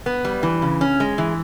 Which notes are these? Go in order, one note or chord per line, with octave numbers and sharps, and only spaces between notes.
B3
G3
E3
C#3
C#4
G#3
E3